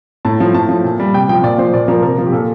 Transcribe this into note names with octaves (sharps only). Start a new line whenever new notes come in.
A2 A5
F3
A2 A5
F3
A#2
G3
C3 G5
F3 G5
A#2 D5
F3 C5
A#2 D5
F3 A#4
C3 A#4
F3
G4
A#2 A4